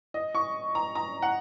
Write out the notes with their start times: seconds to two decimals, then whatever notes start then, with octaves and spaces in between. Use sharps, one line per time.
0.14 D#5
0.35 C#6
0.75 A#5
0.95 A#5
1.22 F#5